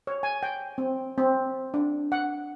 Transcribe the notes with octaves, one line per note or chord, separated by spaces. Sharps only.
C#5
G#5
G5
C4
C4
D4
F#5